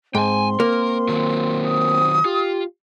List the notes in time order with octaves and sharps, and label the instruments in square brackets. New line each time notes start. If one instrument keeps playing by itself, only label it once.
[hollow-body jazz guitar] G#2 [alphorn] C4 [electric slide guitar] G5 G#5 [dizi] C6
[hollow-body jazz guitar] A#3 [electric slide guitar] A#4
[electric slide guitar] D#3 F#3
[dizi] D#6
[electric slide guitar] F4 [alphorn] G4